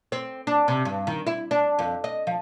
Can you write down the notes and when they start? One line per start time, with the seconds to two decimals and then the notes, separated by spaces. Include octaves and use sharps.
0.12 C4
0.47 D4
0.68 C3
0.85 G2
1.07 D#3
1.27 E4
1.51 D4
1.79 F2
2.04 D#5
2.27 F3